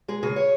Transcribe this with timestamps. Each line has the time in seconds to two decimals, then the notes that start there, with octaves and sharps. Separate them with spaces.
0.08 G#3 G#4
0.23 C#3 G#4
0.36 C#5